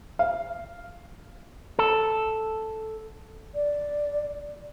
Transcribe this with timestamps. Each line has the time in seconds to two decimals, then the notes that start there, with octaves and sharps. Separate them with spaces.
0.19 F5
1.79 A4
3.55 D5